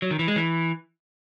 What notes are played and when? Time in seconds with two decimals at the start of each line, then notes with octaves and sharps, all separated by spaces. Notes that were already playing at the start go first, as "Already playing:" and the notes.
0.02 F#3
0.11 D#3
0.19 E3
0.28 G#3
0.36 E3